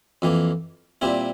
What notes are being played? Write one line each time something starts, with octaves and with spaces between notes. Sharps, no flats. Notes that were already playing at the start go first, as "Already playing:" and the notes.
F2 E3 A#3
A#2 G3 C4 E4